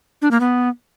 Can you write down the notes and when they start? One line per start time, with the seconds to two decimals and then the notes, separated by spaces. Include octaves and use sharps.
0.22 D4
0.31 A#3
0.40 B3